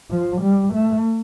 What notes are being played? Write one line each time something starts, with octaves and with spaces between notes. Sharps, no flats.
F3
G3
A3